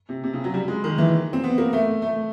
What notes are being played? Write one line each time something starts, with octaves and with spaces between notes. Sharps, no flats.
C3
C3
C#3
F#3
G3
G#3
D#3
E3
C4
B3
A#3
A3
A3